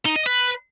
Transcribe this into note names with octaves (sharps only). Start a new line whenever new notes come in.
D#4
D#5
B4